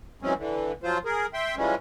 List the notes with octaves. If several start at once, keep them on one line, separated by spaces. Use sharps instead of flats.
E3 F#3 G#3 C4 C#4
D3 E3
F3 F#3 F4 C5
G#4 A#4
E5 G5 C6
E3 F3 G3 G#3 C#4